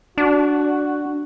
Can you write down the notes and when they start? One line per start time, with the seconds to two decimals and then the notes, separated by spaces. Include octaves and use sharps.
0.18 D4 F#4